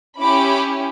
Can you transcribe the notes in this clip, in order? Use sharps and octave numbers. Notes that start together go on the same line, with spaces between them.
C#4 E4 G4 B5 D6